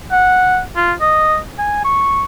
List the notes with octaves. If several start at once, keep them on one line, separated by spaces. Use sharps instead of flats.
F#5
F4
D#5
G#5
C#6